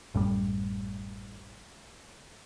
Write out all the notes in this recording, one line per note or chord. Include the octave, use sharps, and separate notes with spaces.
A1 F#2 A2 G3